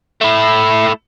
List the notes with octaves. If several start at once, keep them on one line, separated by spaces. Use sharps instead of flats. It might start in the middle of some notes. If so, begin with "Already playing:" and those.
A3 E4